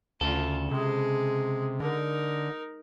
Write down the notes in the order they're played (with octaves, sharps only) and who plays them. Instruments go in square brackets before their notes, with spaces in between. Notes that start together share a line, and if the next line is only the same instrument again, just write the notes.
[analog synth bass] D2 [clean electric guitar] C#3 A4 [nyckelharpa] F4
[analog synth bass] C3 [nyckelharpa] G#3 G#4
[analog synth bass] D3 [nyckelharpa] D#4 A#4